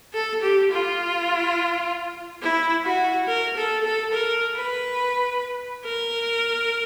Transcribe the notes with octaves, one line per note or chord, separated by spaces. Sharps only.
A4
G4
F4
E4
F#4
A#4
A4
A4
A#4
B4
A#4